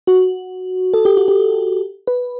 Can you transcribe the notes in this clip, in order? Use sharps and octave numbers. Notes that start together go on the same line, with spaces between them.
F#4
A4
G4
F#4
G4
B4